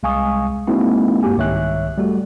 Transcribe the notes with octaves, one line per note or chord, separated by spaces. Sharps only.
C2 G#3 F5 G#5 C#6 D#6
G#3 A#3 C4 D#4 E4 F#4
G2 A#3 F#4 G4 G#5
C2 G#2 D#3 C#5 E5 F#6
G3 A3 F#4